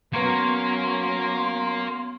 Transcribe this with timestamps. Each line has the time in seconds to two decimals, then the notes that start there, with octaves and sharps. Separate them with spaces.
0.13 F#3 A#3 B3 C#4 A#4 C6 C#6 G#6